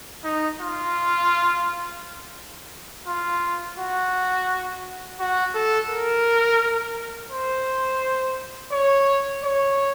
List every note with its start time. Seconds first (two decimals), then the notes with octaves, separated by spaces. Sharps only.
0.24 D#4
0.61 F4
3.07 F4
3.79 F#4
5.20 F#4
5.55 A4
5.89 A#4
7.31 C5
8.72 C#5
9.43 C#5